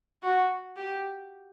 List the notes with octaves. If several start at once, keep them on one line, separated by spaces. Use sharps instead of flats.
F#4
G4